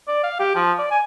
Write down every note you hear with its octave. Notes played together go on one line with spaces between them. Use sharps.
D5
F5
G4
F3
D5
G#5